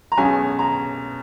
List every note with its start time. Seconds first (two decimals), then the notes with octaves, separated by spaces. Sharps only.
0.12 A#5
0.17 B1 B2 G#3 C#4 G#5
0.59 A#5